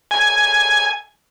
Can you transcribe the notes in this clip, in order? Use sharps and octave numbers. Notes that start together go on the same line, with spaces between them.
G#5